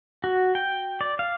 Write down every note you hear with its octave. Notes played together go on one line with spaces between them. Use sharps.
F#4
G5
D5
F5